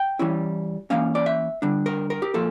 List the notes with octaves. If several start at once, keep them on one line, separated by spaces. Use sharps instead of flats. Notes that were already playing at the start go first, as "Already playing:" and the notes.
Already playing: G5
E3 G3 C#4 E4
E3 A#3 C#4 F5
D5
E5
D3 G3 D4
A#4
A#4
G4
A#2 F3 A#3 A4